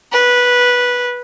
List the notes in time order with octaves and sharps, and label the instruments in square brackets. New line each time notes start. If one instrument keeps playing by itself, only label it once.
[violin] B4